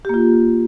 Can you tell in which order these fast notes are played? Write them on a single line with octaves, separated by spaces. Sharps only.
G4 A#3 F4